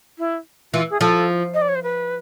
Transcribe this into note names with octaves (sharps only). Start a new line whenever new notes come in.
E4
E3 F4
G#4
F3 A4
D#5
D5
C#5
C5
B4